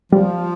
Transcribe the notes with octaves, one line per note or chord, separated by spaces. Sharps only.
F3 G3